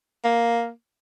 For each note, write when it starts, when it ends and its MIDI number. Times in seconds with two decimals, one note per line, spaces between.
0.24 0.70 58